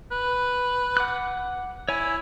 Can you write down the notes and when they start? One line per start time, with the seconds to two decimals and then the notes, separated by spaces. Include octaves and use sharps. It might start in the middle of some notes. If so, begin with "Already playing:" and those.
0.12 B4
0.97 F#5 D6 F#6
1.89 E4 C#5 G#5